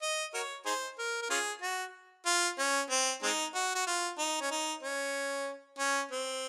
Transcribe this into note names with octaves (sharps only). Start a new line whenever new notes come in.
D#5
F#4 A#4 C#5
D#4 G#4 C5
A#4
A#4
C#4 F4 G#4
F#4
F4
C#4
C4
G#3 C4 D#4
F#4
F#4
F4
D#4
C#4
D#4
C#4
C#4
C4